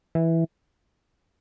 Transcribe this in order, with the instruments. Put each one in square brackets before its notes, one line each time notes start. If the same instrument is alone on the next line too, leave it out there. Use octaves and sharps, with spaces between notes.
[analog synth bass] E3